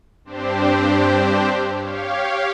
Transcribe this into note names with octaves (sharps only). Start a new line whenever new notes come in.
G2 C4 D4 G4 C5
G4 C#5 F5